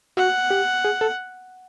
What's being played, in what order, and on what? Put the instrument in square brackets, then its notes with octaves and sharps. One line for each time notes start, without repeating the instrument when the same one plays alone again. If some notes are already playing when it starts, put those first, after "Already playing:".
[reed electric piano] F#4 [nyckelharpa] F#5
[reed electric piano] G4
G#4
A4